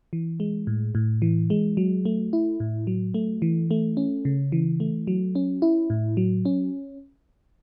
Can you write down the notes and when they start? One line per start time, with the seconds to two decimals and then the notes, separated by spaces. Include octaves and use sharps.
0.13 E3
0.40 G#3
0.67 A2
0.95 A2
1.22 E3
1.50 G#3
1.77 F#3
2.05 A3
2.33 E4
2.60 A2
2.87 F#3
3.14 A3
3.42 E3
3.71 A3
3.97 C#4
4.25 C#3
4.52 E3
4.80 A3
5.07 F#3
5.35 C#4
5.62 E4
5.90 A2
6.17 F#3
6.45 C#4